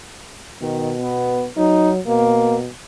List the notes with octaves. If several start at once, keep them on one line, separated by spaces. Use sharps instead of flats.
B2 D#3
B3
F#3 D#4
B2 A#3